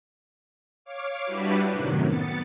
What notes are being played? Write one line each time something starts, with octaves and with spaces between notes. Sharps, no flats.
C#5 F5 D6
G3 D4 E4 F#4 G4 B4
F#2 A2 C3 D#3 F#3
B3 A6 C#7